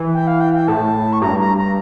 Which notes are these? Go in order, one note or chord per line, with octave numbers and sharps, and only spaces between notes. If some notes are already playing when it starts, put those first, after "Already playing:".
Already playing: E3
G5
F5
G5
G5
A2 A5
C#6
G2 A#5
A#5
A#5